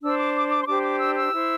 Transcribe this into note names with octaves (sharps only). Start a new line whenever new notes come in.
D4 C5 E6
D6
D6
D6
C6
D4 G4 C5 D6
D6
E6
E6
E4 C5